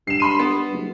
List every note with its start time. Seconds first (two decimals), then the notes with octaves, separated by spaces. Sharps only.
0.07 G2 C7 E7
0.20 B5 C6 D#7
0.40 B3
0.73 F#1